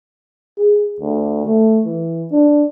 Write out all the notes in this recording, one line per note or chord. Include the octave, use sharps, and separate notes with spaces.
G#4
D2
A3
E3
D4